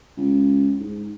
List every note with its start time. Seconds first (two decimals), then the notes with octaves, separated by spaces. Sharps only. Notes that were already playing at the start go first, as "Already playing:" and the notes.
0.17 C#2
0.80 G#2